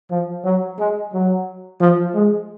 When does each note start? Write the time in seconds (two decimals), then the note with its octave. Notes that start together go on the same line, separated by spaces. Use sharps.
0.11 F3
0.45 F#3
0.80 G#3
1.14 F#3
1.81 F3
2.15 G#3